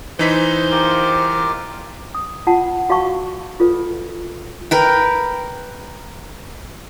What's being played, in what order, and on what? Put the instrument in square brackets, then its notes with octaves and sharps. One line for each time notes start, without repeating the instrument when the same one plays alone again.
[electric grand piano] E3 D#4 B6 [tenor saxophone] C5
[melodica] F4 G4 A#4
[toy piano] D#6
F4 F#5 A5
F#4 F5 A5 C#6
F4 A4 B4
[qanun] A#4 B4 G5